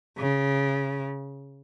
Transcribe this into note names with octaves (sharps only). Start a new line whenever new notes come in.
C#3